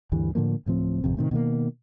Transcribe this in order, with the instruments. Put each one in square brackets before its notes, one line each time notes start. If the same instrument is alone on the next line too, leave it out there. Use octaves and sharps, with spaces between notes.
[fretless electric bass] D2 G2 E3 G3
A2 D3 F3 A#3
D1 A2 F3 C4
G#1 F2 C3
A2 C3 D#3
B2 D#3 G3 A#3